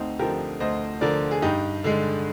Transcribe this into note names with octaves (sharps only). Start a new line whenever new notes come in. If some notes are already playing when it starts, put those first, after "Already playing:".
Already playing: D2 C4 D#4
D3 F3 G4 A#4
D2 C5 D#5
D3 F3 A#4 D5
G#4
G2 D#4 G4
D3 G#3